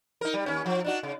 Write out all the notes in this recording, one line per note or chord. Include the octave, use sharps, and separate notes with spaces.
D#4 A#4
G3
D#2 C#4
F3
D4 D#4 F#4
C#3